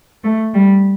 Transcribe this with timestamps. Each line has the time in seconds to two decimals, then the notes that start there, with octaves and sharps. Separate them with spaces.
0.24 A3
0.54 G3